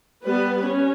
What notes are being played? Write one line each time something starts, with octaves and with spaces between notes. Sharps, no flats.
G3 B3 B4
C#4